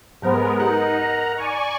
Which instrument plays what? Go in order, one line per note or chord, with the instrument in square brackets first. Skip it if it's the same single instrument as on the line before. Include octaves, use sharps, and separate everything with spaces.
[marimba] G#2 F#3 C5 [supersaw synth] G#3 B3 A#4
[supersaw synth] D#4 [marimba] G4 [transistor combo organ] A#4 F#5
[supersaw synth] A#5
D5 G#5 C#6